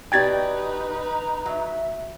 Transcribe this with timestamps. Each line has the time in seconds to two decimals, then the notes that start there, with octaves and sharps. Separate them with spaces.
0.12 B2 D#4 G4 B4 D5 G5 G#6 A6
1.02 A#5
1.46 F#3 E5